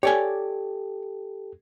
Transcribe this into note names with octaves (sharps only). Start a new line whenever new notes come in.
G4 A4 C#5 D5 G#5